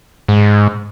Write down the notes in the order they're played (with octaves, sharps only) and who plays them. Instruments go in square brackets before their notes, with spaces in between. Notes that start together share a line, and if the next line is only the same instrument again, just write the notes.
[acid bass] G#2